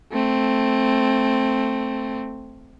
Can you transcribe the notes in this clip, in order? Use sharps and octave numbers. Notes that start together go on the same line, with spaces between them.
A3 C4